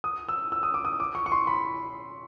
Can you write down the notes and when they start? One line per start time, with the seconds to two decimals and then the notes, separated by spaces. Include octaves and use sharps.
0.04 D#6
0.29 E6
0.52 E6
0.63 D#6
0.74 D6
0.85 D#6
1.00 D6
1.15 C#6
1.26 C#6
1.32 C6
1.47 B5